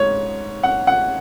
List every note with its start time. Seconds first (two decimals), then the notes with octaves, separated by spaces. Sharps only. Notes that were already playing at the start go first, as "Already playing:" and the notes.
Already playing: G#2 C#5
0.63 F#5
0.87 F#5